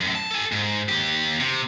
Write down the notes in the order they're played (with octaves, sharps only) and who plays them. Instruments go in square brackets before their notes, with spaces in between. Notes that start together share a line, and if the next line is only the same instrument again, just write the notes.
[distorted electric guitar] F#2 A2
A5
A4 G#5
G#2
D#2 G4
C3